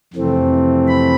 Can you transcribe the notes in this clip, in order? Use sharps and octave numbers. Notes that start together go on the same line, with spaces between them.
F2 C3 E3 A3 C4
B5